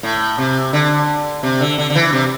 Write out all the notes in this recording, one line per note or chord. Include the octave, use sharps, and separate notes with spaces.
A2
C3
D3
C3
D3
D3
D3
E3
C3